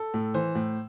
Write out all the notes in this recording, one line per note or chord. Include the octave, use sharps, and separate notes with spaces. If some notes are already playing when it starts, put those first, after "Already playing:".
Already playing: A4
A2
E3 C5
A2